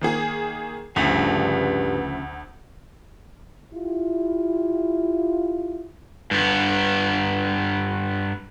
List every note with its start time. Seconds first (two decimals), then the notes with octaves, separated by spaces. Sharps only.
0.01 D#3 A#3 G#4
0.96 D2 G2 C#3 F3 A3
3.73 E4 F4 G4
6.31 G2 B3